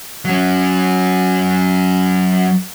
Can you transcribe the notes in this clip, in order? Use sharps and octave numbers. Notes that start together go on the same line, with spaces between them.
F#3 C#4